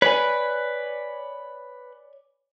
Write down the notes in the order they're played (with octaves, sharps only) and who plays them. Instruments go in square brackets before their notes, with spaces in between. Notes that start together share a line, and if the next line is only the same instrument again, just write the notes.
[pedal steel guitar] B4 [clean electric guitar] C#5 D5 G#5